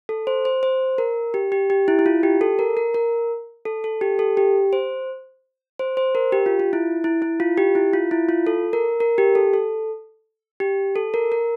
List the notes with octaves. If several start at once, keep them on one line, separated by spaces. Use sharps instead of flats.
A4
C5
C5
C5
A#4
G4
G4
G4
E4
E4
F4
G4
A4
A#4
A#4
A#4
A4
A4
G4
A4
G4
C5
C5
C5
A#4
G4
F4
F4
E4
E4
E4
F4
G4
E4
F4
E4
F4
A4
A#4
A#4
G4
A4
A4
G4
A4
A#4
A#4